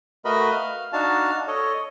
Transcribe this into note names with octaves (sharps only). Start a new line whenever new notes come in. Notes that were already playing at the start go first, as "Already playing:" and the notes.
A3 F#4 A#4 B4 D#5 B5
F5
D4 D#4 F#4 F5 A5
A4 C#5 D#5